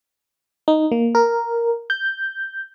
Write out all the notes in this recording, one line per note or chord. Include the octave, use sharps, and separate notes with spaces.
D#4
A#3
A#4
G6